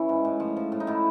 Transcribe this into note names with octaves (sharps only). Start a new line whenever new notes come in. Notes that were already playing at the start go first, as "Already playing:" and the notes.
Already playing: E3 C#4 E4
G#2
A2
F3
F3
A2
D#4
A2 E4